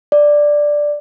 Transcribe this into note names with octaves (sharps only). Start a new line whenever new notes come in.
D5